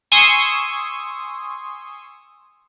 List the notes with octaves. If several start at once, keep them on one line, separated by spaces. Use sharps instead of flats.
G#5 C6 C#6 D#6 E6